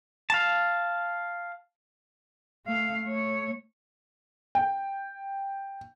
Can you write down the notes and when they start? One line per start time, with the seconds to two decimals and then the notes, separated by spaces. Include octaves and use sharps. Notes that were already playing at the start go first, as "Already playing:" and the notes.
0.30 F5 A5
2.66 A3 F5
3.05 A3 C#5
4.55 G5